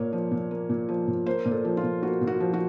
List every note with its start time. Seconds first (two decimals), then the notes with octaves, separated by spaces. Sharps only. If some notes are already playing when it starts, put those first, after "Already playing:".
Already playing: A#2 A#3 C#5
0.13 F3
0.32 A#2
0.51 A#3
0.69 A#2
0.89 F3
1.08 A#2
1.26 A#3 C5
1.46 A#2
1.51 A4
1.65 F3
1.77 F4
1.83 A#2
2.03 A#3 F#4
2.21 A#2
2.27 F#4
2.40 F3
2.54 F#4